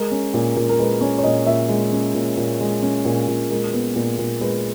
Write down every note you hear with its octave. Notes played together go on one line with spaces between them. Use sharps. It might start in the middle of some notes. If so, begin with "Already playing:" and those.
Already playing: G#3 A#4
C#4
A#2
A#2
A#4
G#3 B4
C#4 C#5
C#5
A#2 D#5
A#2 E5
G#3
C#4
A#2
A#2
G#3
C#4
A#2
A#2
G#3 A#4
B3
A#2
A#2
G#3 B4